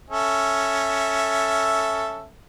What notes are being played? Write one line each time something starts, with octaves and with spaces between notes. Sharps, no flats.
C#4 A4 E5